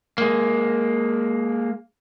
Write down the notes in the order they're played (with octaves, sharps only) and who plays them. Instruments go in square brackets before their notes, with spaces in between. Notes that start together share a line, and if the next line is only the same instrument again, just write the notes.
[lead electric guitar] G#3 A#3